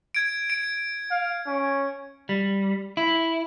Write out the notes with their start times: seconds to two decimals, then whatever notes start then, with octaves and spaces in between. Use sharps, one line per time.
0.15 G#6 D7
0.50 D7
1.11 F5
1.46 C#4
2.29 G3
2.97 E4